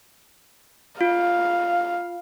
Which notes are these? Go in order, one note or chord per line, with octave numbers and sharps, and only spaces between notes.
F4 F5